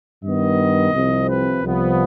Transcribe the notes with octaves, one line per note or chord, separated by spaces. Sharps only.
G2 D#3 B3 D#5
C2 C3 F3 C4
B4
C2 C3 F3 B3